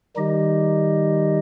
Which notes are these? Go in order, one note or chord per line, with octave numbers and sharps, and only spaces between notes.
D#3 G3 D#4 G4 D#5